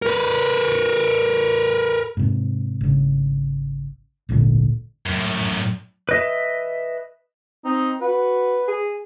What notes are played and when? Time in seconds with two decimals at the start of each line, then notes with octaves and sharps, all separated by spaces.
0.02 A#4 B4
2.17 G#2 C3
2.81 G#1 C#3
4.29 D1 G#1 A#2 D3
5.06 F#2 A2
6.09 B4 D#5 E5
7.65 C4 D#4
8.01 F#4 B4
8.68 G#4